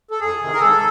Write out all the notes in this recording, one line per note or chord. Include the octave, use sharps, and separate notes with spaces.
A4
F2 G#4
C3 D#3
A#4
G#2 A4